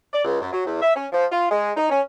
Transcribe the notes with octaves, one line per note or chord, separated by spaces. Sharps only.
D5
C#2
F#2
F#3
E2
E5
C#4
F3
F4
G#3
D#4
C#4